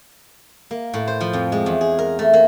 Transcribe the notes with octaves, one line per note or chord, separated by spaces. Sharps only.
A#3
A2
C5
F3
F2
G#3
E2
G#4
A#4
A3
A#3